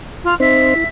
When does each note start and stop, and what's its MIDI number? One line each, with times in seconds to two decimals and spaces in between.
0.23 0.34 65
0.40 0.74 60
0.40 0.74 63
0.40 0.74 72
0.40 0.87 76
0.76 0.84 64